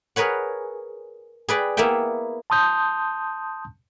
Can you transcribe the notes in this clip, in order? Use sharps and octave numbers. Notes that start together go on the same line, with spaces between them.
G#4 A#4 B4 C#5 F#5
G#4 B4 D5 G5
A#3 B3 E4 E5 G5
A5 C6 D#6 G6